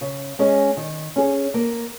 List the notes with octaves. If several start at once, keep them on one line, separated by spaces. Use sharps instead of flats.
C#3
G#3 C#4 G#4 D#5
D#3
C#4 G#4
A#3